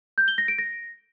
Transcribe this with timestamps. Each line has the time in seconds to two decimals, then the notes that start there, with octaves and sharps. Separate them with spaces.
0.18 G6
0.28 G7
0.38 A#6
0.48 D7
0.58 A#6